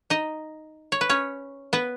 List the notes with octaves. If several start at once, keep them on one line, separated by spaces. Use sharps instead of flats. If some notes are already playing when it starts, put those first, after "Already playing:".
D#4 D#5
C#5
B4
C#4 C#5
B3 B4